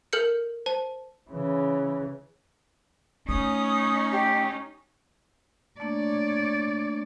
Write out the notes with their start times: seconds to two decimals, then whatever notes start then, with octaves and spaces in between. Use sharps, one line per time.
0.13 A4 A#4 F6 G6 C#7
0.66 C5 A5
1.31 C#3 E3
3.29 A3 C#4 D#4 D#6
4.12 G4
5.80 A3 A#3 D4 C#5 D5